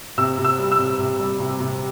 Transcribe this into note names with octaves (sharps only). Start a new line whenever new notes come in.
C3 E6
C3
E6
G3
E6
C3
C3
G3
C3
C3